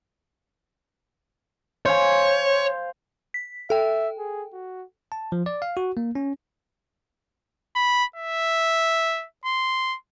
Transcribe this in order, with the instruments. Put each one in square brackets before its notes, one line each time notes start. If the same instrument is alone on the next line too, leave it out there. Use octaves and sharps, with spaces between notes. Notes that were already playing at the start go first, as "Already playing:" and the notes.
[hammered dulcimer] C5 F5 G#5 [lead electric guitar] C#5
[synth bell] B6
[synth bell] A4 G5 [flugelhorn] E5
[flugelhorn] G#4
F#4
[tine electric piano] A5
F3
D5
F5
F#4
A#3
C#4
[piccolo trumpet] B5
E5
C6